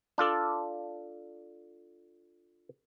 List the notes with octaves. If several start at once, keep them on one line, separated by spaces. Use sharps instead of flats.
D4 F4 A4 D5